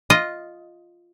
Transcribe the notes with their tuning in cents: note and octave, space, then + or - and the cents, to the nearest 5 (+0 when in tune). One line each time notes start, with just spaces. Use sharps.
F4 +0 D#5 +0